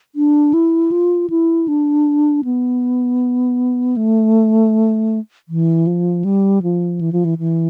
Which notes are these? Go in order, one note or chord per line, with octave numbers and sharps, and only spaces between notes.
D4
E4
F4
E4
D4
B3
A3
E3
F3
G3
F3
E3
F3
E3
E3